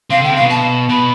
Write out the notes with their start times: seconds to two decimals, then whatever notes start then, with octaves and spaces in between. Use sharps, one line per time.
0.10 C3 F5
0.21 D3 G5
0.30 C3
0.36 B2 F5
0.50 A5
0.89 B2 B5